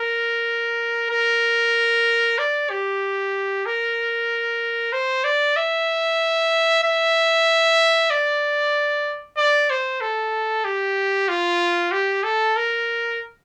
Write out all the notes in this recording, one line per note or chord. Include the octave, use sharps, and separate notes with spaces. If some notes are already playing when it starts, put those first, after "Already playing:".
Already playing: A#4
A#4
D5
G4
A#4
C5
D5
E5
E5
D5
D5
C5
A4
G4
F4
G4
A4
A#4